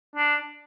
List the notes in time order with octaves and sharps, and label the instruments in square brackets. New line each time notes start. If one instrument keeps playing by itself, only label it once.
[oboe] D4